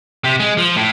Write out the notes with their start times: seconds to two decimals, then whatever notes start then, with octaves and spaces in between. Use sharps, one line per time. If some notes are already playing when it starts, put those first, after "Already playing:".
0.24 C3
0.40 G#3
0.58 F3
0.76 A2